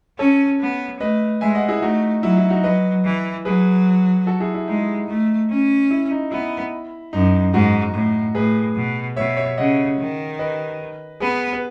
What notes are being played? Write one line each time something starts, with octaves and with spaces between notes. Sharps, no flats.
C#4 A4 C#5
B3
A3 B4 D#5
G#3 E5 G#5
D#5 F#5
E4 G#4
A3 D#4 F#4
F#3 E4
E4
D#4 F#4
F#3 B4 D#5
E3
F#3 G#4 B4
F#4 A4
E4 G#4
E4
G#3 D#4
A3
C#4
E4
D#4
B3 E4
F#2 D#4
G#2 D#4 F#4
A2
A2 G#4 B4
B2
B2 C#5 E5
C#5 E5
C#3 D#5 F#5
D#3
B4 D#5
B3 G#4 B4
B4